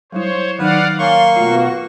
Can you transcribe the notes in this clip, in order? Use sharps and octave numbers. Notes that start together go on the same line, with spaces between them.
F#3 G3 E4 C5 C#5
D#3 F#3 D#4 B4 D5 F5 F#5
A#3 C#5 F5 G#5 C6 C#6
B2 A3 F4 F#4